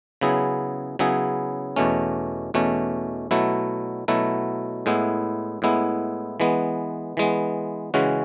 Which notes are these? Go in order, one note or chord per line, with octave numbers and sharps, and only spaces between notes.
C#3 F#3 B3 E4 G#4
C#3 F#3 B3 E4 G#4
E2 B2 A3 C#4
E2 B2 A3 C#4
B2 F#3 A3 E4
B2 F#3 A3 E4
A2 G#3 B3 E4
A2 G#3 B3 E4
E3 G#3 B3
E3 G#3 B3
C#3 E3 G#3 C#4 F#4